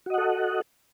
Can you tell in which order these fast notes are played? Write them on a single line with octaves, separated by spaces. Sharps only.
F#4 D#5 F#5 A4